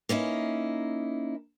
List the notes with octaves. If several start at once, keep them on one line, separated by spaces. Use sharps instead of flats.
A#3 C#4 D#4 E4